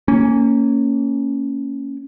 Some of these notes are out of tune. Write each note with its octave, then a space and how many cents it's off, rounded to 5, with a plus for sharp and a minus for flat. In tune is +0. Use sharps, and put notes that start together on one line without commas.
A#3 -20 C#4 +0